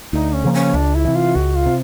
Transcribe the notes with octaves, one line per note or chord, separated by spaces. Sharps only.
D2 D#4
C#4
C#3 F3 A#3
C#4
C#2 D4
E4
C3 E3
F4
C#2 F#4
F4
C3